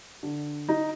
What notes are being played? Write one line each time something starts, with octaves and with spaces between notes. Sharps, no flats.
D3
D#4